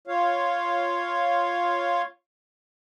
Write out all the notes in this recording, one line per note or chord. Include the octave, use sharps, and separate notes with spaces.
F4 C#5 F5